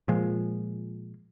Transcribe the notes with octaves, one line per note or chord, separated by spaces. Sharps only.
A#2 F3 G#3